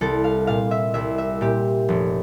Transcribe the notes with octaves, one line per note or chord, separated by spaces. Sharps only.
C2 A4
F5
A#2 F5
E5
C2 E5
E5
A#2 G4
F1